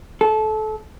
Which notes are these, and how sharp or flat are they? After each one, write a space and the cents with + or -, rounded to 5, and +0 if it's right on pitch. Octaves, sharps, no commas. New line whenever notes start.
A4 -25